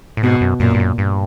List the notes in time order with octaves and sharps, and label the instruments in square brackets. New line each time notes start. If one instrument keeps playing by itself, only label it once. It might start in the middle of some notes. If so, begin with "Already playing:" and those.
[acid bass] A2
[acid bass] G#2 [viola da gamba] B2
[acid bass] F#2
[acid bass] F#2 [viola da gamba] A#2
[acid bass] G2
F#2
G2